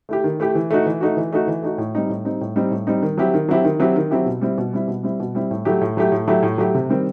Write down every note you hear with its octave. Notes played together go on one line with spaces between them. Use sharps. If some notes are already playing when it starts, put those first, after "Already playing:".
A3 E4 G4
D#3
A3 E4 G4
E3
A3 D#4 F#4
E3
A3 D#4 F#4
E3
A3 D#4 F#4
E3
A3 D#4 F#4
A2
G3 C4 D#4
A2
G3 C4 D#4
A2
G3 C4 D#4
A2
G3 C4 D#4
D#3
F#3 C4 E4 G4
D#3
F#3 C4 E4 G4
D#3
F#3 C4 E4 G4
D#3
F#3 C4 E4 G4
B2
G3 C4 E4
B2
G3 C4 E4
B2
G3 C4 E4
B2
G3 C4 E4
A2
F#3 A3 E4 G4
A2
F#3 A3 E4 G4
A2
F#3 A3 E4 G4
A2
F#3 A3 E4 G4
C3
D#3 G3 C4